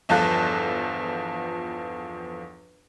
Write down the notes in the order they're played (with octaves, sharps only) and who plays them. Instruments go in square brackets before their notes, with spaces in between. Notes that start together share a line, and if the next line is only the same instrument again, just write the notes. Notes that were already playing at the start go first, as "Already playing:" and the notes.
[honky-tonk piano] G1 E2 F3 F4 A4 F#6